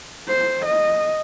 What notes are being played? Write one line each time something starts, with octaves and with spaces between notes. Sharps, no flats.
C5
D#5